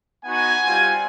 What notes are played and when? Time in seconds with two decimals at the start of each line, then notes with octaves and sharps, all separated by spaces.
0.25 B3 D#4 F#4 F#5 G#5
0.63 G3 C4 F4